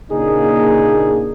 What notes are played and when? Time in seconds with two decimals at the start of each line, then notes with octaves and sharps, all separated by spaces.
0.10 A#2 C#3 A#3 D4 D#4 G#4